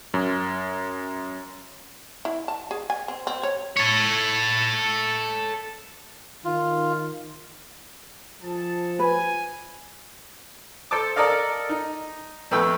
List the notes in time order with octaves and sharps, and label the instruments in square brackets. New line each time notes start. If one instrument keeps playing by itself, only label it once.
[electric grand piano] F#2
[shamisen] E4
A5
G#4
G#5
C4
C4
C#5
[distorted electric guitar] A4 C#5
[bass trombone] D#3 [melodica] F4
[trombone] F3 [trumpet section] G#4 A4 A5
[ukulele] B4 [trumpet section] G#5
[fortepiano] A4 C5 A5 D6
A4 A#4 D5 D#5 F5
D#4
F2 A3 B3 B4 G5 E6